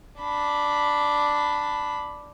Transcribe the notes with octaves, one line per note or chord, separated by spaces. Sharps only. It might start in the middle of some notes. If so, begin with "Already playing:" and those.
D4 B5